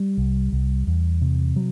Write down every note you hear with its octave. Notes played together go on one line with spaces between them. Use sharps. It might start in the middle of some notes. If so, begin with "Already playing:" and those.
Already playing: G3
C2
C2
E2
C3
F#3